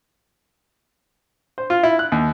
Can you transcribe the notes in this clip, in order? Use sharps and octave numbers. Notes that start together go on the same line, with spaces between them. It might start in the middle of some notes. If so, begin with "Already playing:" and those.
C5
F4
E4
F#6
D#2